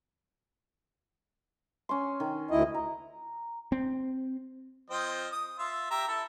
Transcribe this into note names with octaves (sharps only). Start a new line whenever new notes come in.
C#4 C6
D#3
D2 E4 D#5
A#5
C4
F3 C4 D#5
D#6
F4 E5
G4 E5 A#5
E4 A4